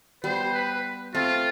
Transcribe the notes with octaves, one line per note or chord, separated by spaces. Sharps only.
G3 B3 C5
B4
A3 C4 F4